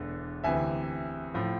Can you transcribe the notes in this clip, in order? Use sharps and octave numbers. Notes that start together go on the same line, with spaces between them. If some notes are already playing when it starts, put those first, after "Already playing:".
Already playing: E1 E2 D3
D2 C3 E3 E5 G#5
A2 F3